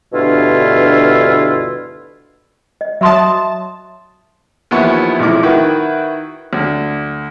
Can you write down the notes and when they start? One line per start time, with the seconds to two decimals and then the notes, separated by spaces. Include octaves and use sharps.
0.13 D2 G2 B2 D3 E4 F4
2.81 D#5
3.01 F#3 E5 A5 C6 D#6
4.71 D#2 E3 F3 B3 E4 C#6
5.19 B1 F2 A2 E4 D6
5.43 D#3 E4 F#4 B4 G5 C#6
6.53 D2